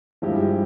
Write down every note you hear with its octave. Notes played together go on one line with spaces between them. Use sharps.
G2 F3 G#3 E4 G4